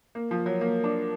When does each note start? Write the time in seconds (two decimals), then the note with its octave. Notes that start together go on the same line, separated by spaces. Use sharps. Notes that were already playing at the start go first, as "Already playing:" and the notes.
0.15 A#3
0.31 F3
0.46 F#3
0.61 A#3
0.84 D4